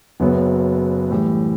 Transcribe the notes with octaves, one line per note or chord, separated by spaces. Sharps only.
F#1 F#2 F#3 B3
A2 E3 G3